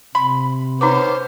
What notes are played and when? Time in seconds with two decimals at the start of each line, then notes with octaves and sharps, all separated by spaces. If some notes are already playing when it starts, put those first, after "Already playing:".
0.15 C3 B5 C6
0.81 B3 C#4 D#4 C5 A#5 D6